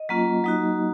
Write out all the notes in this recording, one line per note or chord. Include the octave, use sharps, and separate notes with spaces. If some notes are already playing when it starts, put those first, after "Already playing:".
Already playing: D#5
F#3 A#3 C#4 F4
F#3 A#3 D#4 F#4